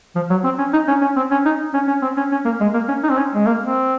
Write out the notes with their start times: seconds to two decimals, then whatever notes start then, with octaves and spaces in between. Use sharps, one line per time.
0.16 F3
0.30 F#3
0.44 C4
0.59 C#4
0.73 D#4
0.88 C#4
1.01 C#4
1.16 C4
1.31 C#4
1.45 D#4
1.74 C#4
1.88 C#4
2.02 C4
2.17 C#4
2.32 C#4
2.45 A#3
2.60 G#3
2.74 A#3
2.88 C#4
3.03 D#4
3.10 C4
3.17 C#4
3.35 G#3
3.46 A#3
3.60 C4